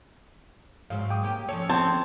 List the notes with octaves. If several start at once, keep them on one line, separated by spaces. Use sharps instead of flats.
G#2 F#3 C4 F5
G5 D6 D#6
A#3 G4
F3 C#4 A4 C#5
C4 A5